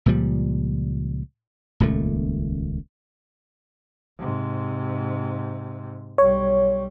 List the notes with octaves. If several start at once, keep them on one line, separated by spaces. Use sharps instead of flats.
C#2 A#2 F3 G3
D#1 C#2 A#2 A3
G#2 C3
B1 G3 C#5